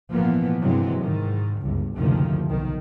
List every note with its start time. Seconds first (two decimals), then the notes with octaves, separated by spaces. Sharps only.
0.12 G#1 A#2 E3 F3 A#3 B3
0.60 G2 C3 E3 F#3 G#3 C4
0.99 G#2 D#3
1.61 G1 C#2 G2
1.95 F#1 D2 C3 D#3 F3
2.48 B1 D#3